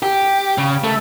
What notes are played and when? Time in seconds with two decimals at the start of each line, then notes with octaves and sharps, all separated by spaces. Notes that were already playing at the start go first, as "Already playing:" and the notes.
0.02 G4
0.58 C#3
0.84 A3